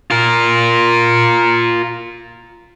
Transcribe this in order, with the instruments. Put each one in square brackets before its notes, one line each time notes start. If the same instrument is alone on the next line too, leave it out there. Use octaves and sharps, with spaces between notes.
[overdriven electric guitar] F4 A#4